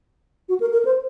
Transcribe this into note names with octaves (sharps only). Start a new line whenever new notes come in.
F#4
A#4
A#4
C5